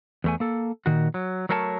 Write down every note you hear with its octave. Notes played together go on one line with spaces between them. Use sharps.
E2 A3 G#5
A#3 A4
A#2 D#3 F#4
F#3
F#3 A3 A#4 C#5 E5 A5